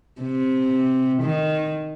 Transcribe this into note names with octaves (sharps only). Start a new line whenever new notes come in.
C3
D#3